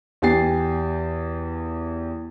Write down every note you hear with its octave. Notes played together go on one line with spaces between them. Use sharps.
E2 G4 G#5 A6 C7